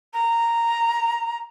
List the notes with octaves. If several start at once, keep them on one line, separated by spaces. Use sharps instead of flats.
A#5